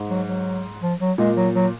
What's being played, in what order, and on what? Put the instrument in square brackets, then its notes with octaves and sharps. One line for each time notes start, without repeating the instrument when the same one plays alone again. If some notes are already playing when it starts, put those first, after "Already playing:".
Already playing: [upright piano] G#2
[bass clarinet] F#3
F#3
F3
F#3
[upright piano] A#2 [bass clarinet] G#3
[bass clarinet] F#3
F#3